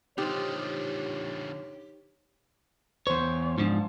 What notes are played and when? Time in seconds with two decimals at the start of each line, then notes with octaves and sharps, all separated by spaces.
0.18 D3 F3 D#4 G4 C5 C#5
3.07 E2 C5 C#5
3.58 G#2 F3 D4 F4